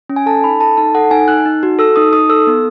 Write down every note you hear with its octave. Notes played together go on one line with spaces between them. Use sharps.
C#4
G#5
A4 A5
D#4 B5
A4 A5
D#4 A5
A4 F#5
D#4 G#5
D#4 F#6
D#4
F#4
A4 E6
D#4 D#6
D#4 D#6
A4 E6
B3